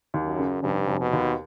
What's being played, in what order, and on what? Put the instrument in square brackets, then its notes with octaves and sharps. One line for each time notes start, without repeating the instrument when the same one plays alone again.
[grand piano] D#2
[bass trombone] F#2
[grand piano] C#3
[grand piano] F1 [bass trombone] G2
[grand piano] F1
[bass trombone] B2
[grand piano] D#2